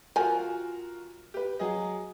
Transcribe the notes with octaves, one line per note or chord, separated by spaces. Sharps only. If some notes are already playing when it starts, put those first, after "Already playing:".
F3 F4 F#4 A#4 G#5
G4 B4
F#3 G#4 D#5